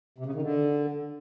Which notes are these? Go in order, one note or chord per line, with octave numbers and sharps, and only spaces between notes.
C3
C#3
D#3
D3